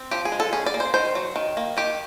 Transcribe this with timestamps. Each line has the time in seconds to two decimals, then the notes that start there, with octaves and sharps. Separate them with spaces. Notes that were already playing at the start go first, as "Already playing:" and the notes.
Already playing: C4
0.11 F3 G4
0.25 G#4
0.32 G#3
0.40 A4
0.53 C#4 G#4
0.66 D5
0.74 A#3
0.80 C5
0.94 D#3 C5
1.15 F#3
1.36 D#3
1.57 A#3
1.77 D#3 G4